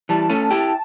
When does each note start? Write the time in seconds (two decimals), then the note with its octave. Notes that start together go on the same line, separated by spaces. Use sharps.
0.09 E3 G3 A5
0.30 A3 C#4
0.51 E4 G4